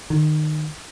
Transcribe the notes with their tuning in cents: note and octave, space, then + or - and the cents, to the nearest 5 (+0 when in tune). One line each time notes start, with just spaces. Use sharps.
D#3 -25